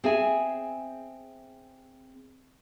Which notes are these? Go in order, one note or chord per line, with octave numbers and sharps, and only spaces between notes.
C4 G#4 E5 G#5